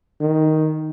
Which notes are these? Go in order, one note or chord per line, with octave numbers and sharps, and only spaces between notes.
D#3